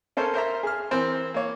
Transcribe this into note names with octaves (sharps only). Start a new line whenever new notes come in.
C#4 A4 A#4 C5 C#5
A#4 C5 E5 A#5
G#4 F6
E3 C4 A#4 C5
A#3 C#5